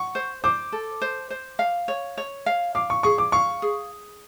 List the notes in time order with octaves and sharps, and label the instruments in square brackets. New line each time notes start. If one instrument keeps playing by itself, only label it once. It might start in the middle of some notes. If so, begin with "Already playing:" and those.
Already playing: [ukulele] F#5 [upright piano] C#6
[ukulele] C5
[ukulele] C5 [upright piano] D6
[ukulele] A4
C5
C5
F5
C#5
C#5
F5
[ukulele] F5 [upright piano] D6
[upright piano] C#6
[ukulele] G#4 [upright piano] C#6
[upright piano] D6
[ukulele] F5 [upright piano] C#6
[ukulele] G#4